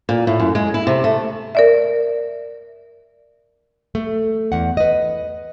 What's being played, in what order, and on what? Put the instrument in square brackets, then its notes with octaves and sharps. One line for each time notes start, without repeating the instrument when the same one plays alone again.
[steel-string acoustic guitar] A#2
A2
F#2
G#3
E4
C3
A3
[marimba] A#4 D5 E5
[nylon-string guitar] A3
E2 F#5
B4 D#5